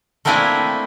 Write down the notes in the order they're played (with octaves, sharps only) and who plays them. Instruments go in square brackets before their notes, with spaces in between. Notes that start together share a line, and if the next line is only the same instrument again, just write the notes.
[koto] A3 A#3 C4 D4 E4 G#5